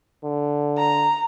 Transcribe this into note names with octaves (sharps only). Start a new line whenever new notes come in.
D3
A#5